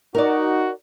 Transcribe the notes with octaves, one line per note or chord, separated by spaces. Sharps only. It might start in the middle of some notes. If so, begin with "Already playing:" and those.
D#4 F#4 A#4 D5